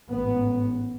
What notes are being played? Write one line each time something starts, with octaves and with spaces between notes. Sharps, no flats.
A1 G#2 B3